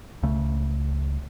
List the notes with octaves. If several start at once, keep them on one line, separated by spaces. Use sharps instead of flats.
C#2 C#3 A3